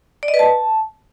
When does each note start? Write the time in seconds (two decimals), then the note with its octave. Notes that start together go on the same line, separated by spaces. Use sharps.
0.23 D5
0.28 D#5
0.34 B4
0.39 A5